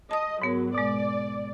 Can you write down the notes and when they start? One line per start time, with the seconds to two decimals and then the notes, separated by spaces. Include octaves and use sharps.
0.11 D#5 A5 D#6
0.42 G#2 F#3 B3 A#4
0.74 B2 G#3 D5